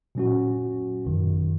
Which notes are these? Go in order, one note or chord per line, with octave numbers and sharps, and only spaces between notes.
A#2 F#3 C#4 F#4
G#1 F#2 D#3